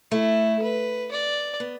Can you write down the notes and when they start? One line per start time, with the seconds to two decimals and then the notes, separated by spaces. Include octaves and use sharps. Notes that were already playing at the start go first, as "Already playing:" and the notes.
0.12 A3 E4
0.62 B4
1.11 D5
1.60 B3